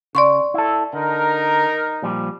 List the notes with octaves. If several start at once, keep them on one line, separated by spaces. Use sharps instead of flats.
C#3 D5 C6 C#6
E4 A4
D3 D#4 A#4
A#2 F3 G3